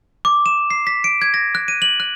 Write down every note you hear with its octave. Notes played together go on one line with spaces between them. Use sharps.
D6
E7
C7
B6
D7
G#6
A#6
F#6
D#7
F#7
F#6